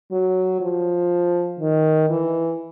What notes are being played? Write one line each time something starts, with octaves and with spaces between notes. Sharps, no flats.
F#3
F3
D#3
E3